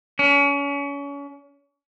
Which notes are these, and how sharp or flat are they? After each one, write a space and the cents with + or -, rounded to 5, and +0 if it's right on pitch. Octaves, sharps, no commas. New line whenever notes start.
C#4 +35